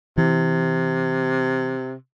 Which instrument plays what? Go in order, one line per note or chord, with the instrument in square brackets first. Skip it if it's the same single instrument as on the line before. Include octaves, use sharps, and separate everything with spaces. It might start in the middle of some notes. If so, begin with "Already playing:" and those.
[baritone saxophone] C3 [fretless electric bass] E3